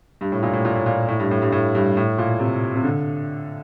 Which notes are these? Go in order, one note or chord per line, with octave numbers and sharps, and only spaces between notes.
G2
A2
A#2
A2
A#2
A2
A#2
A2
G2
A2
G2
A2
G2
A2
A#2
C3
C3
D3